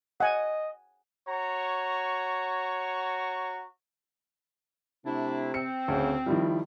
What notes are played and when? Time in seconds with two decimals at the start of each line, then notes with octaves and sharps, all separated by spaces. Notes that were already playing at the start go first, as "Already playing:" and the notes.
0.20 D#5 F#5 G#5
1.29 F#4 C#5 A#5 C#6
5.06 C3 A3 D4 E4
5.54 C4 C#7
5.88 D2 C#3
6.26 D#3 F3 G3 E4